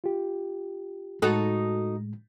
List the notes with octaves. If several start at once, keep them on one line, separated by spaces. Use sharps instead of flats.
F4 G4
A2 G#3 D#4 F#4 A4